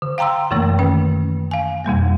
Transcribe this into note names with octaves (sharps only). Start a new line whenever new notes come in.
D3
F5 G5 A#5 C6 E6
F#2 C3 E3 A3 A#3
D#3 C#4 B4
F5 G#5
F2 B2 G3 A#3